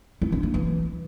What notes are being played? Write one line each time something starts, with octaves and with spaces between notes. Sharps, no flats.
E4
D4
A#3
E3